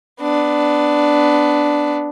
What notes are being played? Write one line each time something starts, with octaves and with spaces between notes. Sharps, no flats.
B3 D4